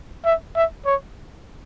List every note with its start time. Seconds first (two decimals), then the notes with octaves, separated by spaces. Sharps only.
0.25 E5
0.56 E5
0.86 C#5